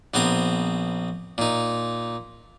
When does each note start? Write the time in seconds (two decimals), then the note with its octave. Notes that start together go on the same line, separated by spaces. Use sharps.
0.14 A#1 B3 C4 A#5 D#6
1.38 A#2 D#4